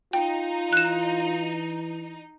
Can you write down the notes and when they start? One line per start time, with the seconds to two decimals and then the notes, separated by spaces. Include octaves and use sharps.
0.13 D#4 F4 G5
0.73 E3 F#6 E7